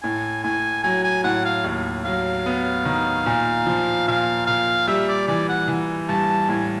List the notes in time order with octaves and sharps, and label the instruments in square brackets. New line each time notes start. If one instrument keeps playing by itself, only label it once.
[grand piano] A2 [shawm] G#5
[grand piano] A2 [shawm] G#5
[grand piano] F#3 [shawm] G#5
[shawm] G#5
[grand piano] A2 [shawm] F#5
[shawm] F5
[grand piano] D#2
[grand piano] F#3 [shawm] F5
[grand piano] B3
D#3
A#2
F3
[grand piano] A#2 [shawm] F5
[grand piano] A#2 [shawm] F5
[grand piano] G3 [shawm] E5
[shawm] D5
[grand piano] E3 [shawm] D5
[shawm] F#5
[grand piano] E3
[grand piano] G2 [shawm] A5
[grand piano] A2 [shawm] G#5